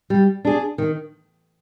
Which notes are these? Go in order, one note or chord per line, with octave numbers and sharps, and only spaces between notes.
G3
D4 G#4
D#3